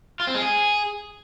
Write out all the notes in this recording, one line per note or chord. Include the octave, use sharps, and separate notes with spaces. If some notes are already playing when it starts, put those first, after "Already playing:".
F4
C4
G#3
G#4